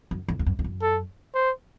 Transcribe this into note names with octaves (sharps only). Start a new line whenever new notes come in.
F#2
F2
F2
F#2
F2
F#2
A4
C5